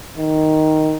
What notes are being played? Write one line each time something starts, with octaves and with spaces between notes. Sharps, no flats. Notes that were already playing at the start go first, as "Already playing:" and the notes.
D#3